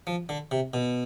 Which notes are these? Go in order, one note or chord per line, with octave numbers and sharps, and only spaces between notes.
F3
D3
C3
B2